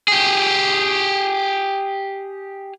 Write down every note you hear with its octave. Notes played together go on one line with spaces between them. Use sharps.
G4 G#4